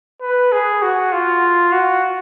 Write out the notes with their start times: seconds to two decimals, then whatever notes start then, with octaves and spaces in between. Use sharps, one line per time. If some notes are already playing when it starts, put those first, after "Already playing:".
0.21 B4
0.52 G#4
0.82 F#4
1.12 F4
1.72 F#4